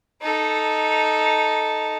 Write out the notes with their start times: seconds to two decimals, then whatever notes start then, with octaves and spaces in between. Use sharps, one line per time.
0.22 D#4 A4